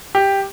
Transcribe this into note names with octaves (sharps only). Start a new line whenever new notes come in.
G4